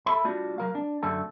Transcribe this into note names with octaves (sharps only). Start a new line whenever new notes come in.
A4 E5 B5
G3 A3 D4 F4 F#4
F#3 A#4 F5
D4
F#2 D3 A3 A4